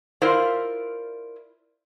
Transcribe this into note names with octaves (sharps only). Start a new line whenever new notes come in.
E4 F4 A#4 C5 D5 F5